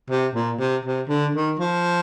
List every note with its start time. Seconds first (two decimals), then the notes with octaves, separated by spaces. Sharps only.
0.10 C3
0.35 A#2
0.59 C3
0.85 C3
1.09 D3
1.35 D#3
1.59 F3